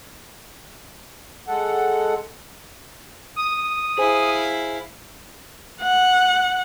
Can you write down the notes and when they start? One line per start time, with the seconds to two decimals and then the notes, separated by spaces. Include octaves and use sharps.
1.48 G#3 A4 F#5
3.36 D#6
3.98 E4 G#4 C5 F5 G#5
5.82 F#5